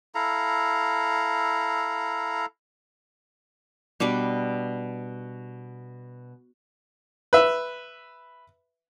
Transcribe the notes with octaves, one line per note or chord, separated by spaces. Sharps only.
E4 A4 F5 A#5
B2 G3 D4 B4
B4 E5